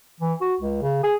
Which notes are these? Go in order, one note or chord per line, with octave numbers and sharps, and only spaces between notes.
E3
F#4
C#2
C#3
G#4